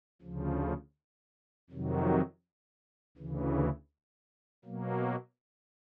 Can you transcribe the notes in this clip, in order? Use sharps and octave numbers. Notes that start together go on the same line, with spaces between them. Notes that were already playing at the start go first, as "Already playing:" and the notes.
D2 C#3 F3
F2 C3 D#3 F#3
D2 C#3 E3
B2 F#3 A#3